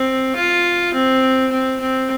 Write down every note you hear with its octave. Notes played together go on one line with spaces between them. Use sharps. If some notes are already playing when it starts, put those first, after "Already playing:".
Already playing: C4
F4
C4
C4
C4